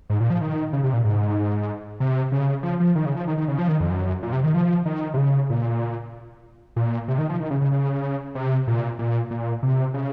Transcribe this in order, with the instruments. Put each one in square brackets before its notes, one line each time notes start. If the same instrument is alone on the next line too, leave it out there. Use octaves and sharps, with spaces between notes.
[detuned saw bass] G#2
A#2
F3
D#3
C#3
C3
A#2
G#2
C3
C#3
F3
F3
D#3
C#3
F3
D#3
D#3
C#3
F3
D#3
F2
F#2
A#2
C3
D#3
F3
D#3
C3
C#3
A#2
A#2
C3
D#3
F3
D#3
C#3
C#3
C#3
C3
A#2
A#2
A#2
C3
C#3